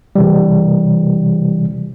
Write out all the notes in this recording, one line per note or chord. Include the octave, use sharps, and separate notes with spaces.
C3 E3 G3